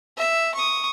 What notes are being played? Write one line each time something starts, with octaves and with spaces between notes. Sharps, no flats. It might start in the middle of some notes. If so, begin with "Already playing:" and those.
E5
C#6 D#6